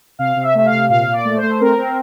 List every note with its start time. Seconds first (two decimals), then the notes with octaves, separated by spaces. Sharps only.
0.19 C3 F5
0.36 C3
0.43 E5
0.55 A3 E5
0.66 F5
0.72 C3
0.90 A#2 F5
1.07 A#2
1.13 D5
1.25 A3
1.37 C5
1.43 A3
1.61 C4 A#4
1.78 C4